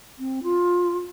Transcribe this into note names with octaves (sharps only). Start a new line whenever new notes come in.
C4
F4